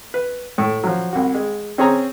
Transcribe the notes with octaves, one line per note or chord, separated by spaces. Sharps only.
B4
A2
F3 F#3
C2 F#4
G#3
C4 C#4 G#4 G#5 A#5